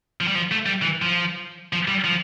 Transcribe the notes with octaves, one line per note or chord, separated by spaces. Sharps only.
F3
G3
F3
A3
G3
E3
F3
F3
G3
F3